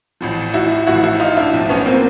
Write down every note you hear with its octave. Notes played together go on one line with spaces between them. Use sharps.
A1 A2 F3
E4 F#4
A1 A2 F3 E4 F#4
E4 F#4
D#4 F4
D4 E4
B1 A2 F3
B3 C#4
A#3 C4